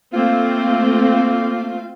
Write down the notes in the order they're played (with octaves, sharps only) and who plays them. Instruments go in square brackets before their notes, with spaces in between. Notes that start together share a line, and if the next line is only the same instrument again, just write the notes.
[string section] A3 C4 [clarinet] A#3 [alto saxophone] F4